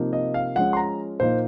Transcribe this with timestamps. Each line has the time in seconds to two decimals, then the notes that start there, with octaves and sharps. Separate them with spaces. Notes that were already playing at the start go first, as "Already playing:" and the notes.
Already playing: C3 F3 A#3 D#4
0.13 D#5
0.34 F5
0.55 F3 G#3 C#4 F#5
0.73 C6
0.77 A#5
1.20 A#2 F3 A#3 D#4 C5